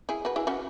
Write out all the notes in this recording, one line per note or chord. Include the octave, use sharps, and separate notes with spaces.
E4 G#4
F#4 B4
E4 G#4
C#4 F#4